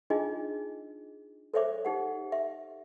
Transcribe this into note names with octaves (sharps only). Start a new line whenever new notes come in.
D4 D#4 F4 G#4 D#5
A4 C5 C#5 E5 D6
D#4 G4 F#5
E5